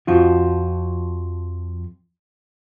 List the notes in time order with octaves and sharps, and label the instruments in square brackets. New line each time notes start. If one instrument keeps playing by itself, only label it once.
[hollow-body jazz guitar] F2 F3 F4 F#4